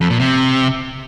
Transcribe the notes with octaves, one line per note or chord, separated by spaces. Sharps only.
F2
A#2
C3